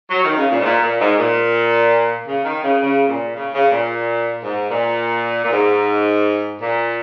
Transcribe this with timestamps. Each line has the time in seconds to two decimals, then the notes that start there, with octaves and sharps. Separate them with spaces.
0.11 F#3
0.24 D#3
0.36 C#3
0.51 A#2
0.60 G#2
0.65 A#2
0.82 A#2
1.00 G#2
1.18 A#2
2.26 C#3
2.45 D#3
2.63 C#3
2.81 C#3
3.08 A#2
3.35 C#3
3.54 C#3
3.71 A#2
4.43 G#2
4.70 A#2
5.44 A#2
5.52 G#2
6.61 A#2